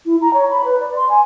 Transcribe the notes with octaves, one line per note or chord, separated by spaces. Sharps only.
E4
A#5
C#5
B5
B4
D5
C6
G#5